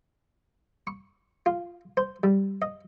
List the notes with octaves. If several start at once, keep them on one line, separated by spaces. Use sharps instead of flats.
C#6
F4
C5
G3
D#5